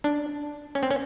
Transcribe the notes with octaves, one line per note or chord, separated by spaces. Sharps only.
D4
C#4
C4
C#4